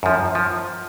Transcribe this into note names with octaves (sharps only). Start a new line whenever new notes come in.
F#2 F3
F3